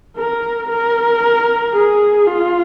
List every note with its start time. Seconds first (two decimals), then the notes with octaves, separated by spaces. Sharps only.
0.17 A#4
0.70 A#4
1.74 G#4
2.27 F4